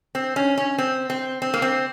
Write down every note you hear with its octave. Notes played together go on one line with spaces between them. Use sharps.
C4
C#4
C#4
C4
C4
C4
A#3
C4